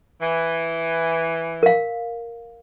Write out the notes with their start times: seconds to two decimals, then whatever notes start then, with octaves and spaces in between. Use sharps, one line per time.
0.21 E3
1.63 A#4 F5